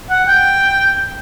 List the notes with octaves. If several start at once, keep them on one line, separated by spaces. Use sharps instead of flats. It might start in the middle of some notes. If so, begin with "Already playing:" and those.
F#5
G5